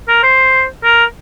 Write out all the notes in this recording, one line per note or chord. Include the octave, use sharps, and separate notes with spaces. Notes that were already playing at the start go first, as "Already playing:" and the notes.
A#4
C5
A#4